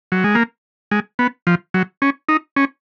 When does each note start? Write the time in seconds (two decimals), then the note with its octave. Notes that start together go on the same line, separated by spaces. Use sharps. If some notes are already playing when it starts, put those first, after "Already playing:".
0.12 F#3
0.24 G#3
0.35 A#3
0.91 G#3
1.19 B3
1.47 F3
1.74 F#3
2.02 C#4
2.29 D#4
2.56 C#4